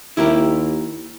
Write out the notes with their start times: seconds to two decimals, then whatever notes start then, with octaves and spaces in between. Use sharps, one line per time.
0.17 D#2 E4 G4 A#4